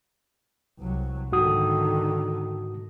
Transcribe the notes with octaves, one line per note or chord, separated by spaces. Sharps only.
C2 F#3
G#2 D3 D#3 F#4 D#6